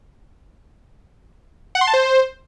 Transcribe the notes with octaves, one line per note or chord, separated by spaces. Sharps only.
F#5
C6
A5
C5